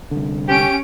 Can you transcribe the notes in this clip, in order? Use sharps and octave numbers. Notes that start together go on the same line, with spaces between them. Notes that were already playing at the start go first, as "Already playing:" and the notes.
C2 D3
C#4 G4 D7